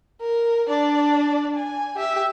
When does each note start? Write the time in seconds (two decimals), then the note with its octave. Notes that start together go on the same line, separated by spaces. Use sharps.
0.21 A#4
0.68 D4 D5
1.56 G#5
1.96 G4 E5